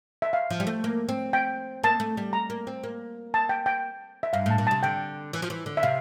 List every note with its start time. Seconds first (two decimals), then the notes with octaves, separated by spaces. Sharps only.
0.22 E5
0.33 F5
0.50 F3
0.60 G3
0.67 A3
0.84 A#3
1.09 C4
1.33 G5
1.84 A#3 A5
2.00 A3
2.17 G3
2.33 A#5
2.50 A#3
2.67 C4
2.83 A#3
3.34 A5
3.49 G5
3.66 G5
4.23 E5
4.33 G2 F5
4.46 A2 A5
4.58 A#2
4.67 C3 A5
4.83 D3 G5
5.33 E3
5.42 F3
5.50 E3
5.66 D3
5.77 E5
5.83 C3 F5